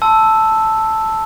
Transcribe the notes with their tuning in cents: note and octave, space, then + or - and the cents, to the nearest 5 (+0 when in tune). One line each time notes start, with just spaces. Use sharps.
A5 +0 C6 +0 E6 +0